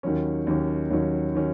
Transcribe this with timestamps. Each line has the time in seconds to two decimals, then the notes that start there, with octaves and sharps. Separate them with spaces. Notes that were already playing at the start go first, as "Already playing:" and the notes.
0.03 D#2 D#3 F#3 C#4
0.47 D#2 D#3 F#3 C#4
0.90 D#2 D#3 F#3 C#4
1.35 D#3 F#3 C#4